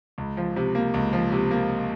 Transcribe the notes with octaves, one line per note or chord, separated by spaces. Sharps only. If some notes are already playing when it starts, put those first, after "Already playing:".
C#2
F3
C3
A#3
C#2
F3
C3
A#3